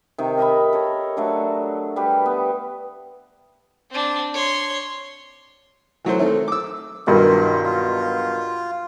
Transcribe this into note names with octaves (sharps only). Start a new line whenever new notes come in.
C3 D#3
A#4 D#5 E5 B5
A4 A#4 C#5
F#3 A3 D4
G3 G4 B4
B3
C4 D4
C#5 C6
E3 F#3 A3 C5
D#3 A3 C4
D6 E6
B1 G2 D#3 E4 F4
F4